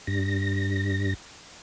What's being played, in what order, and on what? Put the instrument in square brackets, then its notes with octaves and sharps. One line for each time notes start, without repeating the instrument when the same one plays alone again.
[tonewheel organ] G2 A#6